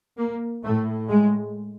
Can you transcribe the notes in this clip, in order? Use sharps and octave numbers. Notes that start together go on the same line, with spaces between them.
A#3
A2 A3
G#3